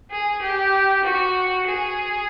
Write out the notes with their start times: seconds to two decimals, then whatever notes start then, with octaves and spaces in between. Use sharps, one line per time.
0.11 G#4
0.42 G4
1.05 F#4
1.67 G#4